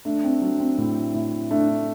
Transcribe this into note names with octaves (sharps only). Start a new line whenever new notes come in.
A3 D4
C4
F#3 D4
C4
A2
A2 E4
A3 D4
D4